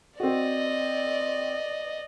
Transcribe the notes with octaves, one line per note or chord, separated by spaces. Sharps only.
C4 F#4 D5 D#5